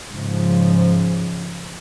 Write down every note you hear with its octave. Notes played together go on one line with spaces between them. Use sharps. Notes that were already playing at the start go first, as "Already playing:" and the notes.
G#2 C#3 F3